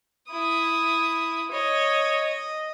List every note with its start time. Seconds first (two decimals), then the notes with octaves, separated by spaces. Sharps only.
0.31 E4 D#6
1.52 C#5 D#5
2.24 D#5